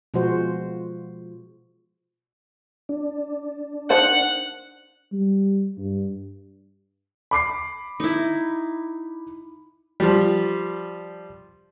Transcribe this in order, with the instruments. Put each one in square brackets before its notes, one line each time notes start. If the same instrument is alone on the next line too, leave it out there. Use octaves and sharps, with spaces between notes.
[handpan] B2 F3 G#3 F4 F#4 C5
[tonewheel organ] D4
[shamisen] D#3 C5 A5 [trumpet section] F#5
[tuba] G3
G2
[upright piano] B5 D6 C7
[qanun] D#4 E4
[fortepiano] F3 G3